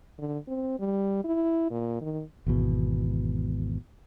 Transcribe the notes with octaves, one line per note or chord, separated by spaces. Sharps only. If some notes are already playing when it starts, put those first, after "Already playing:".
D3
C4
G3
E4
A#2
D#3
G#1 E2 B2